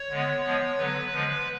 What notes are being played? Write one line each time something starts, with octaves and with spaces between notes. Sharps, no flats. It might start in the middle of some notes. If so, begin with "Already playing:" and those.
Already playing: C#5
D3 G#3 B3
F3 G#3 B3
D3 F#3 B3 B4
D3 F3 G#3